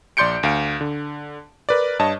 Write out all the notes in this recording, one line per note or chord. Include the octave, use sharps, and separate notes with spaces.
A#1 D5 C6 G6 C#7 D7
D2 F5 D7
D3
A#4 B4 D5
G2 C#5 D#5 A5